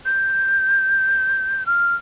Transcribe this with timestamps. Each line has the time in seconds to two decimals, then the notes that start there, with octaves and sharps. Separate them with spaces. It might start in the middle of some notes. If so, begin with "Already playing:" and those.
0.06 G6
1.66 F6